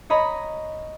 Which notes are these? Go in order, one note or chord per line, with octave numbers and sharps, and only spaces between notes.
C#5 D#5 A#5 B5